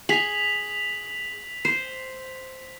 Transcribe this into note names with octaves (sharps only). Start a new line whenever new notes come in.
G#4 B6 F7 F#7
C5